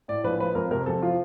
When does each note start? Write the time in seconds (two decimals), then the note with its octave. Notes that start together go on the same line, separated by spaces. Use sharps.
0.08 A2 D5
0.24 A#1 B4
0.40 F3 B4
0.55 F2 A#4
0.71 C3 A#4
0.86 F2 A4
1.02 F3 F4